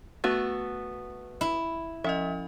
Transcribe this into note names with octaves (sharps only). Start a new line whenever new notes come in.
A3 B3 F#4
E4
F3 C#4 D#5 E5